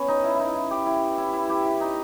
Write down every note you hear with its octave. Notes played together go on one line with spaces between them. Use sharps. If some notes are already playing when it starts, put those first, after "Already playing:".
Already playing: B3 C#4
D#4
E4
D#4 E4
E4
G4
E4
E4
E4
G4
E4
D#4